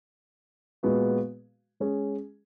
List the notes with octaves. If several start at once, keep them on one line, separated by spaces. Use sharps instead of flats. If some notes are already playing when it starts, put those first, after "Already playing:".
A#2 G#3 B3 F#4
G#3 C#4 G#4